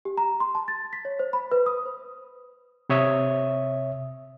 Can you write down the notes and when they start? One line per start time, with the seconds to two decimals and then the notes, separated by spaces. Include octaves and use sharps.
0.05 G4
0.17 A#5
0.40 C6
0.55 A5
0.68 A6
0.93 B6
1.05 C#5
1.19 C5
1.33 B5
1.52 B4
1.66 D#6
1.86 C5
2.89 C3 C#5 E5 D#6